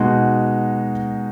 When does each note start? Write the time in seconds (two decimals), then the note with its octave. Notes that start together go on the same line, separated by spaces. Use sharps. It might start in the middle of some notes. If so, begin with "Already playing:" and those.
Already playing: B2 G#3 D#4 F#4